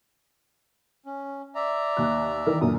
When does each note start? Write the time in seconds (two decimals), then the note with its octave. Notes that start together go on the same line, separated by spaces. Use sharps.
1.06 C#4
1.55 D5 E5 A#5
1.97 D#2 F#6
2.46 D#3 E3 A#4
2.61 F#2 A#2 D3 D#6